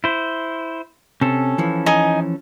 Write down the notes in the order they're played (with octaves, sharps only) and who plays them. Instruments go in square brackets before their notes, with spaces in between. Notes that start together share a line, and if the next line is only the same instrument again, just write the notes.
[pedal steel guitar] E4 C5
[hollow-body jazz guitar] C3 [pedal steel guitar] C#4 A4
[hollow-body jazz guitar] E3 F3
[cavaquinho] D#4 D#5 G#5